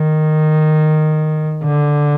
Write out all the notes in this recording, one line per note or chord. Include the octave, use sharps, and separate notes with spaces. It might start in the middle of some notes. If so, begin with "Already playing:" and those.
Already playing: D#3
D3